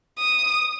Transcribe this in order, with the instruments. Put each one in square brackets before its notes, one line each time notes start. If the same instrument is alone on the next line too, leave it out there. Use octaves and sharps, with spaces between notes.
[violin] D#6